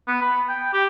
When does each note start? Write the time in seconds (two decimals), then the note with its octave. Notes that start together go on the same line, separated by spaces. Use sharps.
0.07 B3
0.21 B5
0.49 G5
0.73 G4